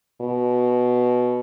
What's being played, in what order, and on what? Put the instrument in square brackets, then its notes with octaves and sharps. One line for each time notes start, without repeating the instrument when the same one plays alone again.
[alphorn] B2